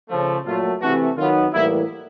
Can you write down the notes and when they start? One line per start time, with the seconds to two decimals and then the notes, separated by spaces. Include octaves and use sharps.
0.09 C#3 F3 A3
0.45 A#2 F#3 A3 F4
0.81 C3 E3 A3 F#4
1.16 D#3 F#3 B3 F4
1.53 A2 E3 G3 A#3 E4